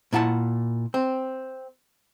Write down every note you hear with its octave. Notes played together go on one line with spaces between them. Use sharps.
A#2 E4 F#5 A5
C4